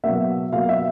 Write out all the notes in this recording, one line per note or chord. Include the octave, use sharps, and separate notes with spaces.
B2 F#3 A#3 E5
B2 F#3 A#3 F5
E5